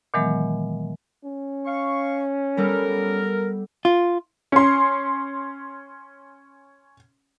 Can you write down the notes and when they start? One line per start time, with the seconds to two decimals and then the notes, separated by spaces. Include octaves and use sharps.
0.14 A#2 D#3 E3 F#3 G#3 B3
1.25 C#4
1.66 F5 C#6
2.57 G3 B3 A4 A#4
3.85 F4
4.52 C#4 C6